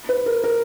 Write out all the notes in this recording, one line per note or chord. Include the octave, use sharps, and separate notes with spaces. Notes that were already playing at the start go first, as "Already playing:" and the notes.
B4
A#4
A#4